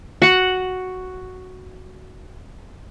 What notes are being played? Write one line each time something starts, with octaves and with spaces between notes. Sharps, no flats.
F#4 F#5